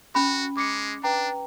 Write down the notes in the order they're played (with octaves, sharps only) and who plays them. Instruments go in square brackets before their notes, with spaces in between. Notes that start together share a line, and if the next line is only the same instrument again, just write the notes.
[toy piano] C#4 B5 [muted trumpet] F#4
[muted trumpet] G#3 [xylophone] D6 C#7
[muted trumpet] D4 [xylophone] B4 G5 A#5